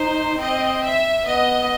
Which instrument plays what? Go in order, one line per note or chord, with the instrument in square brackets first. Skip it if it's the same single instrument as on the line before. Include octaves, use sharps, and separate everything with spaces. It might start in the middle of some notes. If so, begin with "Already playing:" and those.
Already playing: [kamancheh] D#4 [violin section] C5
[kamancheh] C4 [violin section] D#5
[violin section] E5
[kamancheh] B3 [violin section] D#5